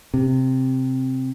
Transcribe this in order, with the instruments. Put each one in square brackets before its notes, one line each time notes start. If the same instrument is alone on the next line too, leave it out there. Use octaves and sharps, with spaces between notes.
[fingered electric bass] C3